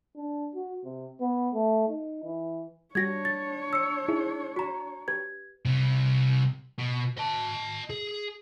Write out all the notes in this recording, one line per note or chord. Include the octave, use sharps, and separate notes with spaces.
D4
F#4
C3
B3
A3
D#4
E3
G3 D4 F#4 G4 C#5 G#6 A#6
A6
E6 C#7
D#4 E4 G#4
F#4 A#5 C#6
G4 B4 G#6
C3 G3
B2
D#5 A5
G#4